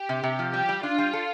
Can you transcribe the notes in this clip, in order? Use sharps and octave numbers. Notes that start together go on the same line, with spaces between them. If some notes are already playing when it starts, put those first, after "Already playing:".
Already playing: G4
C3
C3
F3
G3 G4
G3
D4 F4
G3
A4